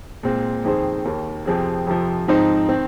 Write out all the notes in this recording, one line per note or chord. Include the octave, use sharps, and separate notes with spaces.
A#2 G#3 C4
F2 D#3 C4 G#4 C5
D#2 D#3 A#3
F2 C3 F3 C4 G#4
F2 C3 F3
G#2 F3 C4 D#4 C5
D#3 C4